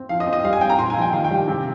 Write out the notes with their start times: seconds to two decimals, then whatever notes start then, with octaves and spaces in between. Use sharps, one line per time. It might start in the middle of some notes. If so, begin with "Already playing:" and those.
Already playing: C4
0.09 F3 F5
0.20 D#5
0.27 C4
0.33 D#5
0.44 G3 F5
0.53 G#5
0.61 G3 G5
0.70 A#5
0.78 A#2 C6
0.90 G#5
0.96 F3
1.02 G5
1.13 D#3 F5
1.24 G5
1.31 G3
1.48 C3